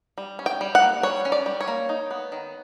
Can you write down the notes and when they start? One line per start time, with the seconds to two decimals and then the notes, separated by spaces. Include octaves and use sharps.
0.18 G3
0.39 C#4
0.46 G5
0.61 G3
0.75 F#5
0.82 A#3
1.03 G3 C#5
1.25 C#4
1.32 D5
1.46 G3
1.61 C#5
1.68 A#3
1.89 D#4
2.11 B3
2.32 D#3